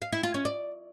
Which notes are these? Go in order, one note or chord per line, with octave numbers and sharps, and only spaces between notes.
F5
E4
F4
C#4
D5